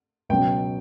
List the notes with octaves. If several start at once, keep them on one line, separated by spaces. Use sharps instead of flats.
C#2 B2 F#3 G5